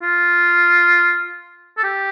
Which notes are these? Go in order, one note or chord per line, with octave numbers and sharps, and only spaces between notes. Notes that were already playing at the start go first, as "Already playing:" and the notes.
F4
A4
G4